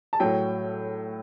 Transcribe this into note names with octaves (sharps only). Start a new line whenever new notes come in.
A5
A2 F#3 G5